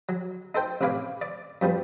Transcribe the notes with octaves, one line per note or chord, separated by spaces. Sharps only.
F#3
D#4 A4 C5 G5
A1 C3 B4 C#5 F5 D6
D5 D6
F#2 F3 G3 B3